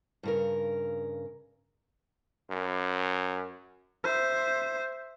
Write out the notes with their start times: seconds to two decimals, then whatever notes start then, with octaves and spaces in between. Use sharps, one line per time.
0.23 G2 C#3 A#4
2.50 F#2
4.04 C5 E5